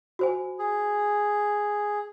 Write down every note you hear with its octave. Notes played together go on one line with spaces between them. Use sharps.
F#4 C5 G#5
G#4